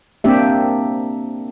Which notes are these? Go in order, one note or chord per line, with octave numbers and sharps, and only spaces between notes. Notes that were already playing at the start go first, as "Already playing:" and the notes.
A#3 C4 D4 G4 E5